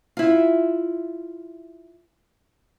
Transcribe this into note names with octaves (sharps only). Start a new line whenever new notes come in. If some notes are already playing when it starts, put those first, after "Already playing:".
E4 F4